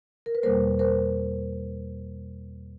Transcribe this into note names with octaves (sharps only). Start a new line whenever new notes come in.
A#4
B4
E2 B2 G3 A#3 A#4 C5
A#4 C5